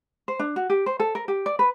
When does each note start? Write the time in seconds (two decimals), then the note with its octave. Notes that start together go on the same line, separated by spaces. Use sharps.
0.28 C5
0.39 D4
0.56 F#4
0.70 G4
0.86 C5
1.00 A4
1.15 A#4
1.28 G4
1.46 D5
1.59 B4